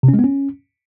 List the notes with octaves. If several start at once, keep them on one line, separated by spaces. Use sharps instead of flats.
C3
C#4
G#3
B3
C#4